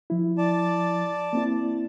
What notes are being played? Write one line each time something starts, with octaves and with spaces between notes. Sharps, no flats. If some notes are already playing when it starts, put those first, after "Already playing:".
F3 E4
D5 A5
A#3 C4 E4